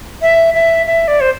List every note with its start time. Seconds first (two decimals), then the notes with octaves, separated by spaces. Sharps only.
0.22 E5
0.54 E5
0.86 E5
1.08 D5
1.21 C5